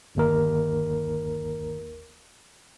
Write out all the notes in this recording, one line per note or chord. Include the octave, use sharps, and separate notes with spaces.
G1 D#2 A#4